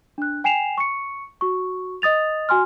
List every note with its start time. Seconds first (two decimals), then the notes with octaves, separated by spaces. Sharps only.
0.18 D4 F#6
0.44 G5 G#5 C7 E7 F7
0.78 C#6 C#7
1.41 F#4 C#6
2.02 D#5 D#6 A6 F7
2.49 F#4 G#5 C6 F6